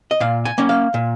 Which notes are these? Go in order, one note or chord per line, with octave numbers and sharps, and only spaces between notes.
D#5
A#2 F5
G#5
A#3 C#4
F5
A#2